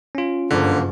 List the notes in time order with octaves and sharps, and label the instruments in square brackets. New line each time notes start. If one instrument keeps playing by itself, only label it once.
[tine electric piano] C#4 F4
[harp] F#1 G2 [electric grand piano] D3 [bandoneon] F3 A#3